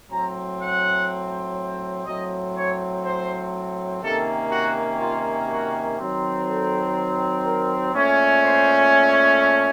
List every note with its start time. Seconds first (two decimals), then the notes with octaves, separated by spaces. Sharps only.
0.10 A2 F#3 C4 A#5
0.60 F#5
2.06 A2 F#3 C4 D#5
2.55 C#5
3.04 C5
4.02 C3 D#3 A#3 C#4 A4
4.51 F#4
5.00 F4
5.49 F#4
5.98 D#3 F#3 C4
6.47 A4
7.44 A#4
7.94 A#2 A3 C#4
8.43 C5
9.40 A5